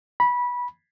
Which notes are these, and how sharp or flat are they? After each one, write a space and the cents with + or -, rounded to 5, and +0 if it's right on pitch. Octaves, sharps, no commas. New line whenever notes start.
B5 -15